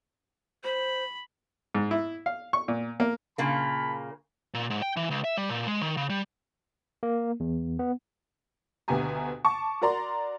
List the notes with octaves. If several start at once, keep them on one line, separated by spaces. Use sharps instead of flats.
C5 B5
G#2
E4
F5
C#6
A#2
A#3
A#2 C#3 A#3 A5 B5
A#2
G#2
G5
E3
C#2
E5
G3
A#2
G#3
D#3
C#3
G3
A#3
E2
B3
D2 B2 B3 G4 G#5 A#5
A5 C#6 D6
F#4 A#4 D5 A#5 C6